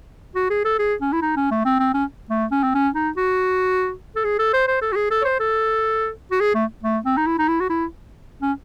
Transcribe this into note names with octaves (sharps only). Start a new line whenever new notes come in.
F#4
G#4
A4
G#4
C#4
E4
D#4
C#4
A3
C4
C4
C#4
A3
C#4
C4
C#4
D#4
F#4
A4
G#4
A4
C5
C5
A4
F#4
G#4
A4
C#5
C5
A4
F#4
G#4
A3
A3
C4
D#4
E4
D#4
E4
F#4
E4
C#4